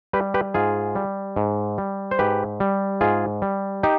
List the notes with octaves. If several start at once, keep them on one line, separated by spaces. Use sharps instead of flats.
G3 G4 B4
G4 B4
G#2 F4 G#4
G3
G#2
G3
C5
G#2 G4 B4
G3
G#2 F4 G#4
G3
D#4 G4